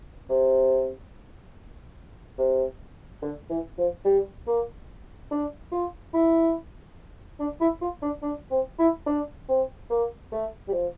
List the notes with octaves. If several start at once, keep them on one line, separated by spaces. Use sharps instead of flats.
C3
C3
D3
E3
F3
G3
A#3
D4
F4
E4
D4
E4
F4
D4
D4
C4
E4
D4
C4
A#3
A3
G3
F3